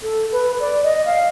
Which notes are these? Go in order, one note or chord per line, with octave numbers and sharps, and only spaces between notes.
A4
B4
D5
D#5
F5